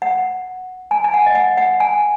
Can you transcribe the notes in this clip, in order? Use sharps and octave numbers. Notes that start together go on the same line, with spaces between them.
F#5
G#5
G#5
F#5
D#5
F#5
F#5
G#5